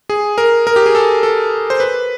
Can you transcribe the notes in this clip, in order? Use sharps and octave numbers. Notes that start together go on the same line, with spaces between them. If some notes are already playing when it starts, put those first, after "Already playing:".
G#4
A#4
A#4
G4
G#4
A4
A4
C5
B4